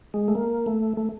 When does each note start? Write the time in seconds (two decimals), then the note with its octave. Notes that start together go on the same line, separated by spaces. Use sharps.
0.14 G#3
0.28 A3
0.35 A#3
0.66 A3
0.97 A3